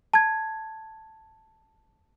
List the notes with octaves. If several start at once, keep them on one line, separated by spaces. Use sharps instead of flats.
A5 G#6